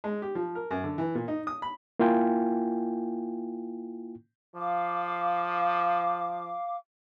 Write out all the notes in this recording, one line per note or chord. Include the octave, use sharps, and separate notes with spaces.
G#3
G4
F3
A#4
F#2
D3
E3
A#2
D#4
D#6
B5
A#3 E4 F4 G5 G#5
F3 F5 D6